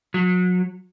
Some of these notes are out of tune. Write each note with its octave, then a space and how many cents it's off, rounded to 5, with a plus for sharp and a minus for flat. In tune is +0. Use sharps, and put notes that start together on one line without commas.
F#3 -35